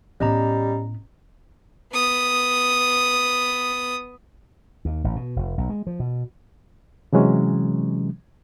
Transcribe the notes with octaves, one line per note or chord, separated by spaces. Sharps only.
A2 G3 B3 C#4 D#5 A#5
B3 D#6
D#2
A1
B2
F1
B1
G#3
F3
B2
C3 E3 F#3 G#3 C#4